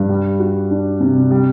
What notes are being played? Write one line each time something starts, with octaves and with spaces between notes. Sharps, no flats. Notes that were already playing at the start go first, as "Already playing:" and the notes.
Already playing: G2
G3
F#4
D4
C3
G3